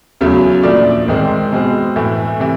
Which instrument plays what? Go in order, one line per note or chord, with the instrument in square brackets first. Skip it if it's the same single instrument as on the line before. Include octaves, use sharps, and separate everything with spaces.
[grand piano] E2 C#3 F#3 A3
A#2 F3 A3 D4 D5
G#2 D#3 G#3 C4
B2 G#3 C4
A2 E3 A3
C3 E3